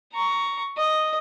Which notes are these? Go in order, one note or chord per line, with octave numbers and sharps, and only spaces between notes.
A#5 C#6
D#5